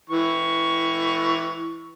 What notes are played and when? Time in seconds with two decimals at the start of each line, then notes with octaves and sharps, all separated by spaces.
0.09 E3 C#6